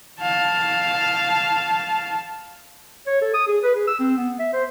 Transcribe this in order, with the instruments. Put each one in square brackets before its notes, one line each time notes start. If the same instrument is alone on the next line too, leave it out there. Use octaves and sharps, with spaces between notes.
[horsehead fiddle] F5 A5
[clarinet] C#5
A4
D#6
G#4
B4
G#4
E6
C4
B3
E5
C5